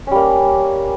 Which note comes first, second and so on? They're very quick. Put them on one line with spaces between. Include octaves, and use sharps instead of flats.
C#4 G3 A#3